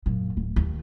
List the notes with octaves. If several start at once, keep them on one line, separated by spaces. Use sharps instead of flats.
F#2 A#2
D1
D#2